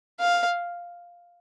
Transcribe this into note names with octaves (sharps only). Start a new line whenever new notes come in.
F5